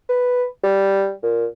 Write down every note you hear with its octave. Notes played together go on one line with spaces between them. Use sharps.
B4
G3
A#2